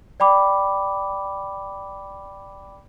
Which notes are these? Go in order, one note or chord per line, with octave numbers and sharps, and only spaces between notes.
D5 G5 B5 D6